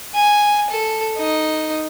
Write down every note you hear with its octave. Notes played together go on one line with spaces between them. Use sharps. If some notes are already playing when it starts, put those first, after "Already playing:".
G#5
A4
D#4